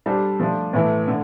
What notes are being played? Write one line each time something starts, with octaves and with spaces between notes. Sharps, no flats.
G3 D4 A4 C5
F3 A3 D4
A2 E3 A3 E4 A4
D3 A3